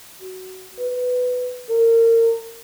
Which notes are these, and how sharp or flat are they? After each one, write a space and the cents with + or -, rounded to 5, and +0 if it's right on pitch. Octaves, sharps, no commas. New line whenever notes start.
F#4 +15
B4 +10
A#4 -30